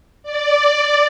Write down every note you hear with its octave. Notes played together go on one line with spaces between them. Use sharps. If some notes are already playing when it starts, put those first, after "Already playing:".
D5